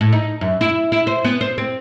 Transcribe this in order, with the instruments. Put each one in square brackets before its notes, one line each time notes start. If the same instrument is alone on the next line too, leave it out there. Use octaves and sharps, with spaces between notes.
[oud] A2
D#4
F#2
E4
E4
C5
B3
C5
C4